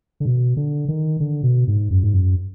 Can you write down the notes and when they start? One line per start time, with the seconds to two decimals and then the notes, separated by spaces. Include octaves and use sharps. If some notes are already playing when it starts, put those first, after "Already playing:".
0.20 D3
0.25 B2
0.57 D3
0.88 D#3
1.20 D3
1.43 B2
1.68 G#2
1.90 F#2
2.03 G#2
2.14 F#2